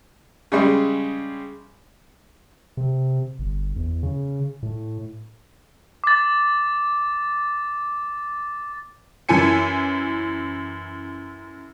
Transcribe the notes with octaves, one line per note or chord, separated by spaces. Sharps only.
C#3 G3 G#3
C3
G1
E2
C#3
A2
D6 A6
F#2 E3 E4 G#5 C#7